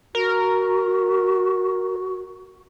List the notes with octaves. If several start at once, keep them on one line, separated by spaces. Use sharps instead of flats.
F#4 A#4